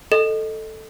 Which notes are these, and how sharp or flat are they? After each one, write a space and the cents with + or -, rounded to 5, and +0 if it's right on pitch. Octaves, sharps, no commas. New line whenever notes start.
A4 +0 D#5 -5